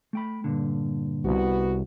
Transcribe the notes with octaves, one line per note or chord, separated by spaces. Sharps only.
A3 G5 B5
G2 A#2 D3
C2 B3 F#4